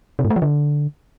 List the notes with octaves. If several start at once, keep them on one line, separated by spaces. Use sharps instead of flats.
C3
G#2
A3
F3
D3